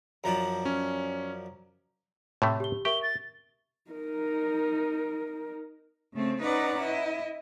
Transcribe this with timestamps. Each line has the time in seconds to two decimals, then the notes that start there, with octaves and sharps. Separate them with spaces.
0.24 F#2 F3 D4 A#5 A6
0.65 C#4
2.42 A2 C3 A3 C#5
2.60 G4 G7
2.85 G4 A#4 E5 C#6 G7
3.03 A6
3.91 D#4 A#4
6.14 C#3 A3 C4
6.42 C#4 D#4 B4 D5 F#5 A#5
6.81 E4 D#5